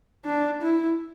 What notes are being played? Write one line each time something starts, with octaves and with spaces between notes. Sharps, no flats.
D4
E4